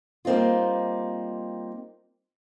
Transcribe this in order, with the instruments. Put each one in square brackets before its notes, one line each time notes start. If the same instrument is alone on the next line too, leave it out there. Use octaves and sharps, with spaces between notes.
[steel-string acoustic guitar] G3 A#3 C4 D#4 F4